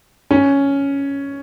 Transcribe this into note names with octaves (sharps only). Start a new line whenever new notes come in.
C#4